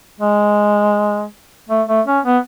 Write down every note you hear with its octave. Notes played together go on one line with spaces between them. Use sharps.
G#3
A3
A3
C#4
B3